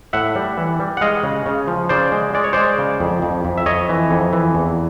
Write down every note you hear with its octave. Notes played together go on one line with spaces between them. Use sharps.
A2 E5 F#5
G3
E3
G3
F#5
G#3 D#5 F5
C#3
C#3
F3
C#3 C5 D5
G#3
G#3 D5
C#5
G#3 C5 D5
C#3
F2
F2
F2
E5
F2 C#5 D#5
E3
F2
E3
E2